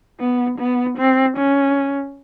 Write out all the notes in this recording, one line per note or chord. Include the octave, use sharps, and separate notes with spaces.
B3
B3
C4
C#4